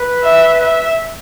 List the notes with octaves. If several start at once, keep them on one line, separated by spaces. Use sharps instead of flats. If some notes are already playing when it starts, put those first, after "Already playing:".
Already playing: B4
E5
E5